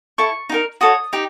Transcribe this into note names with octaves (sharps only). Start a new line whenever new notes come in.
E4 A4 C#6
D#4 G4 A#4
F#4 A4 C#5 D#6
D#4 G4